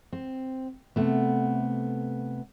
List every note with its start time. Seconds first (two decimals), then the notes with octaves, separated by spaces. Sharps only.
0.13 C4
0.96 C3 A3 B3